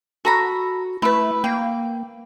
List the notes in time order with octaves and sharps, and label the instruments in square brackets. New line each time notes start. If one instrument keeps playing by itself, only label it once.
[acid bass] F#4 [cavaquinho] A4 A#5 B5
[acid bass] A3 [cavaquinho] E4 B4
[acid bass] A#3 [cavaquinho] G5